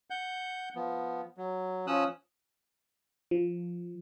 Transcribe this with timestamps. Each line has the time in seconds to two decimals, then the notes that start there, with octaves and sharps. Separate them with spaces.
0.10 F#5 G6
0.75 F3 B3
1.37 F#3
1.87 F3 C#4 D#6 E6 F#6
3.31 F3